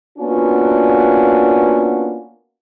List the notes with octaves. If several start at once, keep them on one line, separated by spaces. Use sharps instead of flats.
A#3 B3 C#4 D4 F4 F#4